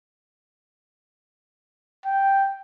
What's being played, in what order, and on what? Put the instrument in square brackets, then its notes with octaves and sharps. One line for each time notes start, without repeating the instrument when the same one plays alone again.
[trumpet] G5